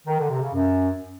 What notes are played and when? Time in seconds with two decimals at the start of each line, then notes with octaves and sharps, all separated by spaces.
0.07 D#3
0.18 D3
0.30 C3
0.41 C#3
0.52 F#2